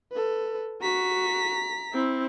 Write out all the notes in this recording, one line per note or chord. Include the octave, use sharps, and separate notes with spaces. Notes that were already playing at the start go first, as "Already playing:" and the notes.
A4 B4
F#4 A#5 B6
C4 E4